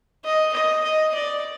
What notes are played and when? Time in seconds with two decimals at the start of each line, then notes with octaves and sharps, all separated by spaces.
0.24 D#5
0.54 D#5
0.83 D#5
1.14 D5